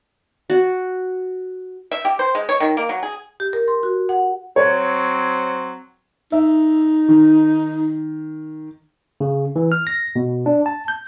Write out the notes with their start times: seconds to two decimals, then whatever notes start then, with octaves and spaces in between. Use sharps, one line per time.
0.50 F#4
1.91 E5
2.05 G4
2.19 C5
2.35 G#3
2.49 C#5
2.60 D#3
2.77 A#3
2.89 F#3
3.03 G#4
3.40 G4
3.53 A#4
3.68 C6
3.83 F#4
4.09 F#5
4.56 F#3 C4 C#5
6.32 D#4 E5
7.08 D#3
9.21 C#3
9.56 E3
9.72 F6
9.87 A#6
10.16 B2
10.46 D4
10.66 A5
10.88 G6